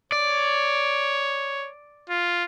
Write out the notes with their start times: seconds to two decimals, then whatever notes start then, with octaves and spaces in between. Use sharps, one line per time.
0.12 C#5 D5
2.10 F4